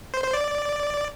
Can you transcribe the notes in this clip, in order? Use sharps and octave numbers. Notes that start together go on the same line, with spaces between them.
C5
C5
D5